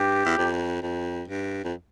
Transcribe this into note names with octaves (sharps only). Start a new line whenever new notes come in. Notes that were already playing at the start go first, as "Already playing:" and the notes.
Already playing: G2 G4
E2
F2
F2
G2
F2